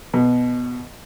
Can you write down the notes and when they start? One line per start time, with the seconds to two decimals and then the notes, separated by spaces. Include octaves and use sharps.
0.14 B2